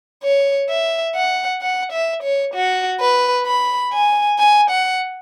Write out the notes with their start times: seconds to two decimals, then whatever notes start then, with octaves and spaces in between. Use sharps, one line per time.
0.23 C#5
0.70 E5
1.15 F#5
1.62 F#5
1.92 E5
2.23 C#5
2.54 F#4
3.01 B4
3.46 B5
3.93 G#5
4.39 G#5
4.70 F#5